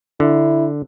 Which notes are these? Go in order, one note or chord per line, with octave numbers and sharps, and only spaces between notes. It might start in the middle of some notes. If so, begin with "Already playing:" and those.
D3 E4